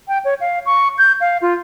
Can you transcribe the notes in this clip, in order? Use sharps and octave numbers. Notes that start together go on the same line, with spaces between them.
G5
C#5
F5
C#6
G6
F5
F4